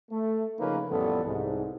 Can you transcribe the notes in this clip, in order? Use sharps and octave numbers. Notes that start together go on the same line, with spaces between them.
A3
C#3 F3 A#3 C#4 D#4 B4
A1 F2 G3 B3 A4
C2 G#2